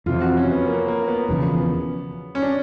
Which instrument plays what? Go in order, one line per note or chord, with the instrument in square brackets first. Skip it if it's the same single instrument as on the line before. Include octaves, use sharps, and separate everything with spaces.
[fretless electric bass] F2 C3 E3 [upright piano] F4
[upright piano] F#4
C#4
B3
A#3
A#3
B3
[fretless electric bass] E1 E2 C#3 F3
[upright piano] C#4
D4